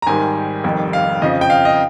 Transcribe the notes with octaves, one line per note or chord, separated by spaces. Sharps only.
A#5
G#1 G#2 D#3 G3 G#5
F1 F2 D#3 G3
F5
F2 C#3 F3 D#5
G5
F5
D#5